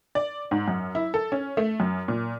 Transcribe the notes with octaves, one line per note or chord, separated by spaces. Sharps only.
D5
G#2
F#2
E4
A4
C#4
A3
F#2
A#2